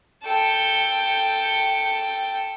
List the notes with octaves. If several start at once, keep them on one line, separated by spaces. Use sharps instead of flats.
A4 G5